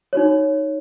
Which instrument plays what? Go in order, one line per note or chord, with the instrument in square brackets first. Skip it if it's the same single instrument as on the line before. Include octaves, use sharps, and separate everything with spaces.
[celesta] D#4 F#4 C#5